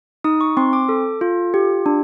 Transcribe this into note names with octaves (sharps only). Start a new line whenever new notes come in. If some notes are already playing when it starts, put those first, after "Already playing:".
D#4 D#6
C#6
C4 C6
D6
A4
F4
G4
D4